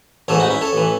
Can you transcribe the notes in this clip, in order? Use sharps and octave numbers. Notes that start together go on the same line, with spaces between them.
A1 G#2 E3 A4 C#5
D#4 F#4
C#4 E4
A4 C#5
A1 E3